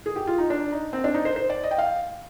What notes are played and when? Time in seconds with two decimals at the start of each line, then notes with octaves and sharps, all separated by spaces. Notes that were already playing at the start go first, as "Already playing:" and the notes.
0.06 G#4
0.16 G4
0.27 F4
0.38 D#4
0.50 D4
0.72 D#4
0.93 C4
1.04 D4
1.14 D#4
1.25 C5
1.36 C5
1.50 D5
1.64 D#5
1.71 G5
1.78 F5